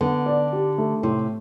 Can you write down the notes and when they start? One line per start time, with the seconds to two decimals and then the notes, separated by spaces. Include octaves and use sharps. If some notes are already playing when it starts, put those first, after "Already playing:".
0.01 D3 B3
0.26 D5
0.53 G4
0.78 A3
1.03 A2 C3